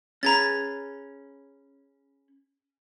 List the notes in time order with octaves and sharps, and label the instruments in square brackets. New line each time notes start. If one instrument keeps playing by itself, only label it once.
[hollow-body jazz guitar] C#4 G#4 B4 [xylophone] A#5 G#6 A6